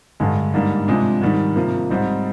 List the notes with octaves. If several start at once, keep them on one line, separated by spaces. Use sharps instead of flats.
G2 D3 G#3
G#2 G3 A#3 D4
C3 F3 G#3 D4
G#2 D#3 G3 D4
C3 F3 A#3
G#2 G3 C4 D#4